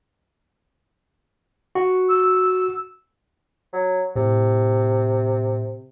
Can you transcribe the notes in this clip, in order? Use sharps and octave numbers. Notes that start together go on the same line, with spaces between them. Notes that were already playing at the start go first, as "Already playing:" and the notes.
F#4
E6
F#3
A2 C3